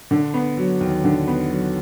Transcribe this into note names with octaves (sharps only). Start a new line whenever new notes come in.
D3
B3
F#3
D#2
D3
B3
F#3